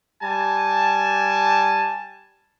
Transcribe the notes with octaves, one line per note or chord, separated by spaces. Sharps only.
G3 G#5 A5